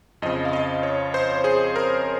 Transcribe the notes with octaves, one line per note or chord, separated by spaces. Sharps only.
F2 C#3 F3 D#5
F5
D#5
C#5
C5
G#4
A#4